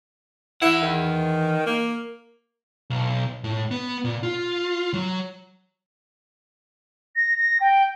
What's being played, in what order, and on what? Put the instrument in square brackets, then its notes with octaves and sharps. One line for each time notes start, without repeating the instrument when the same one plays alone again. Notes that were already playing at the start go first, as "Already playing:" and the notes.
[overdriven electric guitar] E3 F#5 [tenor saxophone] E4
[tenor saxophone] D#3
A#3
[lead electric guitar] B1
A2
B3
A#2
F4
F#3
[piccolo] A#6
A#6
G5